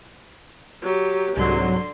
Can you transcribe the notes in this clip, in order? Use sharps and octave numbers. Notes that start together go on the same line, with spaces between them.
F#3 G4
C2 G#2 D3 F#3 C6